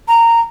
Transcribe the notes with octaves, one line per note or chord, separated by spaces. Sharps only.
A#5